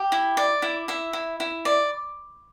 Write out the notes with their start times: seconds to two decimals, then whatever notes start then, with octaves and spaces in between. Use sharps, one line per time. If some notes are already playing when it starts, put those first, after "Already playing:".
Already playing: G4
0.12 E4
0.37 D5
0.62 E4
0.88 E4 E5
1.13 E4
1.40 E4
1.65 D5